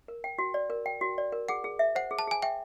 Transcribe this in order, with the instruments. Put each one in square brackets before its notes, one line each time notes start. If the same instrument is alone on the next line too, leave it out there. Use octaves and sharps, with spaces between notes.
[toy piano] A#4
G5
F#4
D5
A#4
G5
F#4
D5
A#4
[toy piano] G#4 [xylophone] F#5
[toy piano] G#4
E5
[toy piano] C5 [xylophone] F#5
[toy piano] G#4
[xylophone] A5
[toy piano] G#4 [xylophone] G#5
[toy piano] E5 [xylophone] G5